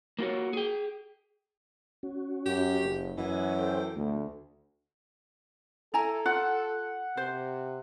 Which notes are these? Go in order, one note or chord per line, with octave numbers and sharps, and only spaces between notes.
A#3 F4 F#4 C#5
G#4 G5
C#4 F#4
F#2 G4
F#1
F#2 E3 D#5 F#5 G#5
A4 C5 G5
D2 A3
E4 A4 G#5 A#5
F4 F#5
C3 C5